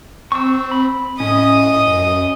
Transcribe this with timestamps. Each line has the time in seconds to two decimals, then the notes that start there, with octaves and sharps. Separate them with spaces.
0.32 C4 C#6 E6
0.71 B5
1.20 A2 C#4 D#5 D#6
1.87 F#2